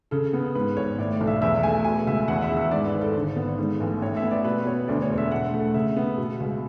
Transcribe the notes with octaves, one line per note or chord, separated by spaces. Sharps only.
C#3 A4
B3
G#2 B4
G#1 C#5
A2 D5
D5
B1
E5
E2 E5
A3 G#5
B2 G#5
C#2 E5
E2 F#5
E5
E3
E5
G#2 D5
B4
G#1
A4
D3
B3
G#2
A1
A2 C#5
E5
B3
D5
B2 B4
B3 C#5
D2 D5
C#5
E1
E5
A2 F#5
A3
C#3 E5
B3
B2
C#2